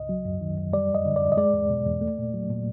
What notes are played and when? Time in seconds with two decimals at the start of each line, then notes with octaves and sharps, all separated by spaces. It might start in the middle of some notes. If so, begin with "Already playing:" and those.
Already playing: C#2 D#5
0.09 F#3
0.25 F#2
0.41 D#3
0.57 F#2
0.73 G3 D5
0.89 F2
0.95 D#5
1.06 D3
1.16 D5
1.22 F2
1.32 D#5
1.37 G#3 D5
1.54 E2
1.70 B2
1.86 E2
2.01 A3
2.18 A#2
2.34 F#3
2.50 A#2